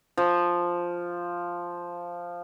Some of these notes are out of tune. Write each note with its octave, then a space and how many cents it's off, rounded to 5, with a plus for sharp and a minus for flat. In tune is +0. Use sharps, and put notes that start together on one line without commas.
F3 +0